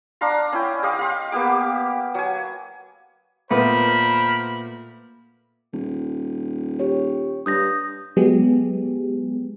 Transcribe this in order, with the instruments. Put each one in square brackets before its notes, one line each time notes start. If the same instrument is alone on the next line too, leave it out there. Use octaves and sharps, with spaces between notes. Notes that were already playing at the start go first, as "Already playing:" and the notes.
[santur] D4 F5 A#5 C6
C#4 E4 G5
G4 D#5 F5
F5 C6
A#3 B3 G4 D6
F#3 G#5
[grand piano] A#2 [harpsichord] A3 B3 D#6 [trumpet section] A#4 C5 B5
[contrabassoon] D#1
[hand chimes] G4 C#5
[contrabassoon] G2 [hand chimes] D#6 G6 A#6
[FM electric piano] F#3 G#3 B3 G4 G#4